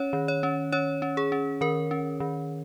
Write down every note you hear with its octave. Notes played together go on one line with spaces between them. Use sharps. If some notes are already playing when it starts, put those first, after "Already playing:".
Already playing: C#4 C#5
D#3
C#5
C#4
C#4 C#5
C#4
G#4
C#4
D#3 A#4
C#4
D#3